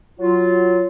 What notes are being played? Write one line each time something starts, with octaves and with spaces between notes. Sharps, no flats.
F#3 F4